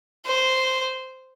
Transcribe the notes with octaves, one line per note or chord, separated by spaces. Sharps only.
C5